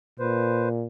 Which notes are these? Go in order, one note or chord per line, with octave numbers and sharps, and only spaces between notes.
A#2 B4 C5